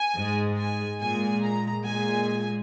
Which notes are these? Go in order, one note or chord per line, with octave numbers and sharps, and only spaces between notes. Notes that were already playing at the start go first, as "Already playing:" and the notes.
Already playing: G#5
G#2 G#3
G#5
A#2 G#3 G#5
A#5
A#2 G#3 G#5